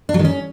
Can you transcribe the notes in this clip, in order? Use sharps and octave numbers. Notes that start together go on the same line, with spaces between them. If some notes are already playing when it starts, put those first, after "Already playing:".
D4
F#3
D#3
C#4